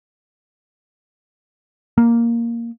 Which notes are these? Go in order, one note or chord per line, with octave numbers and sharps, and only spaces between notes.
A#3